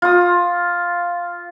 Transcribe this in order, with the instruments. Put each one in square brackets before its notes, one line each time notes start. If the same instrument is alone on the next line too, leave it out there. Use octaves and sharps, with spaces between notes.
[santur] F4 D#6